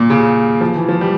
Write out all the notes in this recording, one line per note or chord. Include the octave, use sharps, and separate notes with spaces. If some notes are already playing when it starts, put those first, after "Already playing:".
Already playing: A#2
C#3
F3
E3
F3
G3